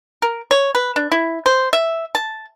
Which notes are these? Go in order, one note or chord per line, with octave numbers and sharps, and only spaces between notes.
A#4
C#5
B4
D4
E4
C5
E5
A5